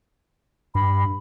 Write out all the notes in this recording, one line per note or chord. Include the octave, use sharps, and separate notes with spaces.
G2 B5